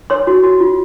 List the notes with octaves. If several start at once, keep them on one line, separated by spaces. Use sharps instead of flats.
C#5 C6
F#4
F#4
F4